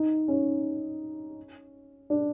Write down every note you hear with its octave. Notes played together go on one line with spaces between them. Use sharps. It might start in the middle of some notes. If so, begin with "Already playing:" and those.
Already playing: D#4
C#4
D4